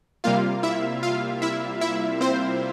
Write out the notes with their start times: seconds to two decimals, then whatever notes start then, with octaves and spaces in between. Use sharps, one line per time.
0.24 C3 G3 A#3 F4 F5
0.63 E4 E5
1.03 F4 F5
1.42 E4 E5
1.81 E4 E5
2.21 C4 C5